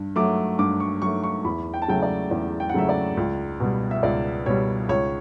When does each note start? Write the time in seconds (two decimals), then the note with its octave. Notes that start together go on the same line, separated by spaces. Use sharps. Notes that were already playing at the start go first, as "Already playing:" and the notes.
Already playing: G2
0.16 F#3 A3 D6
0.59 G2 D6
0.80 C#6
1.02 F#3 A3 C#6
1.24 C#6
1.45 E2 B5
1.74 G5
1.82 A5
1.88 C#3 F#3 A3 G5
2.02 D5
2.31 E2 D5
2.60 G5
2.69 F#5
2.74 C#3 F#3 A3 E5
2.89 D5
3.17 C#2
3.60 B2 G3
3.91 E5
4.03 C#2 D5
4.46 B2 G3 C#5
4.89 C#2 C#5